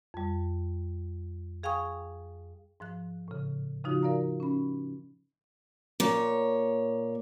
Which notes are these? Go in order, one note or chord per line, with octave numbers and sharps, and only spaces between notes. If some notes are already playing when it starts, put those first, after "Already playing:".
F2 G3
G#4 F5 G5 G#5 C#6 D#6
G#2 F3 F#6
A2 C#3
C#3 F3 D#4 F4 F#4
A#4 D5 F5 A#5
C#4 B5
A#2 C#5